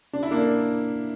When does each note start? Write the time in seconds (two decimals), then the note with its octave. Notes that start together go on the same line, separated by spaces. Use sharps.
0.13 D4
0.23 E4
0.31 A#3 D4